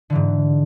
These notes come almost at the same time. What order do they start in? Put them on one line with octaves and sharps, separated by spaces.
D3 E3 G#2